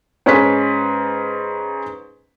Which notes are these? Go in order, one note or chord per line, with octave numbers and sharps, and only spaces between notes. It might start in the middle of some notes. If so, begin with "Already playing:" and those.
G#2 C#4 B4 B6